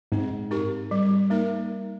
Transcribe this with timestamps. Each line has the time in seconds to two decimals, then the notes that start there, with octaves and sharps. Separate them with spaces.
0.12 G#2 C4
0.51 D#4 G4 A#4
0.91 G3
1.30 A#3 D#4 A#4